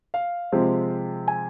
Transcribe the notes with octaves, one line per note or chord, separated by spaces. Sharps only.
F5
C3 F3 G#3 C4
G#5